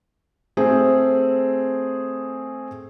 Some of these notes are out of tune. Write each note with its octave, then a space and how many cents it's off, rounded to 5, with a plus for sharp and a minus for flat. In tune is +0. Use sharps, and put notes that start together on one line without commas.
A3 +0 C4 +0 G#4 +0